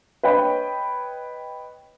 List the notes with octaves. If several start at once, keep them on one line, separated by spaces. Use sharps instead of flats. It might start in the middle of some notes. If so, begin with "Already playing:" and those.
B4 C#5 D#5 G5 B5